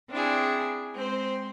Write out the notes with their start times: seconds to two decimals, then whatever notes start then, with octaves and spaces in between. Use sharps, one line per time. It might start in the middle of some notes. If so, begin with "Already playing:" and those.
0.10 C4 D4 E4 G#4
0.94 G#3 C4 C5